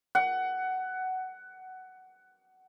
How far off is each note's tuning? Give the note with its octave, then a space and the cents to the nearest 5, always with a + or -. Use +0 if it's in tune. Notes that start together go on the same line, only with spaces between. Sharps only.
F#5 +15